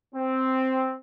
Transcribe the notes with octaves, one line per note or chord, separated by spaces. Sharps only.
C4